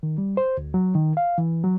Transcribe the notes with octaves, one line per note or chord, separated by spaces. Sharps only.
D#3
G3
C5
D2
F#3
D#3
F5
E3
F#3